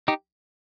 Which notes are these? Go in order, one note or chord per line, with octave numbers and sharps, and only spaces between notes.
D#4 G4